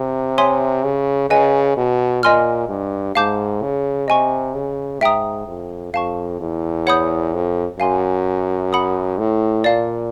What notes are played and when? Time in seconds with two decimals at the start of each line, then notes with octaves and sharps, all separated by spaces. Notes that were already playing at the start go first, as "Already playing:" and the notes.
Already playing: C3
0.38 C#5 E5 G#5 C6 D#6
0.84 C#3
1.30 C#3 B4 D#5 G#5
1.77 B2
2.23 A#2 D#5 G#5 C6 F6
2.69 G2
3.15 G#2 F5 A5 D6 G6
3.62 C#3
4.08 C3 D#5 G#5 C#6
4.54 C#3
5.01 G#2 E5 G5 A#5 D#6
5.47 F2
5.93 F2 F5 A5 C#6
6.41 E2
6.87 C#5 F#5 B5 D#6 G6
7.34 F2
7.80 F#2 F5 G#5 C6
8.73 F#5 B5 D#6
9.18 A2
9.64 A#2 D5 F5 A5